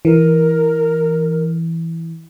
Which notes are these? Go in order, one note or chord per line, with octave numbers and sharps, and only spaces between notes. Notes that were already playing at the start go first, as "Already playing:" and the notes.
E3 A#4